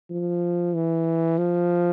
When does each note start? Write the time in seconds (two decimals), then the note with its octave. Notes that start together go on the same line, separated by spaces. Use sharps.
0.10 F3
0.75 E3
1.38 F3